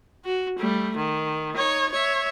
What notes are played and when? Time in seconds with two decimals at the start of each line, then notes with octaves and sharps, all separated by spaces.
0.25 F#4
0.59 G3 A3
0.97 D#3
1.54 D#4 C#5
1.92 C#5 E5